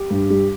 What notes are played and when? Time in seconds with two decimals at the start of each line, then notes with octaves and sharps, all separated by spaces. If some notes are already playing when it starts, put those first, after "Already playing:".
Already playing: G4
0.10 G2
0.30 G3